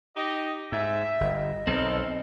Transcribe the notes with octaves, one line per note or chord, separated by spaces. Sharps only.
D#4 G4 D#5
G#2 E5
G1 D#5
B1 C4 D#4 A4 A#4